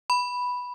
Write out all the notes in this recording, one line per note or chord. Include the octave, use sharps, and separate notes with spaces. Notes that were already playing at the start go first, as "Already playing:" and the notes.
B5